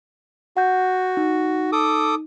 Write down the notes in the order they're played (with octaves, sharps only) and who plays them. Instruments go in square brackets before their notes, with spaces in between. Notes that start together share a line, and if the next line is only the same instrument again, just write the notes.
[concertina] F#4 [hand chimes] F#5 G6
[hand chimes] D#4
[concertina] A4 D6 D#6